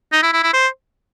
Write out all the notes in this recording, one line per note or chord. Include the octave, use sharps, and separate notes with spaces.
D#4
E4
E4
E4
C5